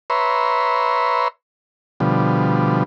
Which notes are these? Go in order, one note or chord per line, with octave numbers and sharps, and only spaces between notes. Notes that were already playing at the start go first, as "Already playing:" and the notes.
B4 C#5 E5 A#5 C6
B2 D3 F3 G3